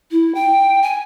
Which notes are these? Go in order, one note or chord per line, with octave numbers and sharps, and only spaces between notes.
E4
G5
G#5